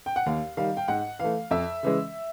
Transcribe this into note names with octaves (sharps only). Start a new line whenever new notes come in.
G5
F#5
D#2 F5
D#3 G3 F5
G5
G#2 F#5
E3 A3 F5
F2 E5
C#3 E3 G#3